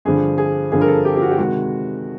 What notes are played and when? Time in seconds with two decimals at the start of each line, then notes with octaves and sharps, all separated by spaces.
0.05 G2 D3 F3 G#4
0.38 G#4
0.71 G2 D3 F3 G#4
0.81 A#4
0.88 A4
1.05 G4
1.16 G4
1.22 F#4
1.31 G4
1.38 C3 D#3 G#3 F#4